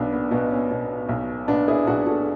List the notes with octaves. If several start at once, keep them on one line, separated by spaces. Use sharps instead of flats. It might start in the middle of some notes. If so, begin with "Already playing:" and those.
Already playing: B1 B2 B3 D4
B3
B2 B3
C#4
B2
B1
B2 B3 D4
E4 G#4
B1 D4 F#4
F#4 A4